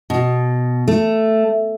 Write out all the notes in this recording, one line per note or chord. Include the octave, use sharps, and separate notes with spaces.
B2
A3